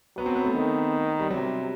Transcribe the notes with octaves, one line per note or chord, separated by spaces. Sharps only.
F#3 B3
C4
B3
A3
D#3
G3
C3 F#3